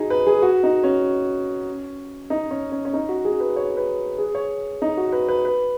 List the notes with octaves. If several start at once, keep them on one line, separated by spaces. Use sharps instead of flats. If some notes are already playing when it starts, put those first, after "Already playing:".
Already playing: D#4 F#4 G#4
B4
G#4
F#4
D#4
C#4
D#4
C#4
C#4
C#4
D#4
F#4
G#4
B4
C#5
B4
G#4
C#5
D#4
F#4
B4
B4
B4